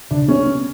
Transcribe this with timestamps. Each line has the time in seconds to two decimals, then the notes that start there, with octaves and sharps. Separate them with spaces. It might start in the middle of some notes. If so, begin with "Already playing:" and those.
0.11 C#3 D4
0.28 B3 C#4
0.46 B3